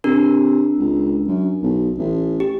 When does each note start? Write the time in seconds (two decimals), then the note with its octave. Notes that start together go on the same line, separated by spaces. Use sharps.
0.04 C3 D4 A#4
0.78 C#2
1.27 F#2
1.63 B1
1.98 A1
2.40 G4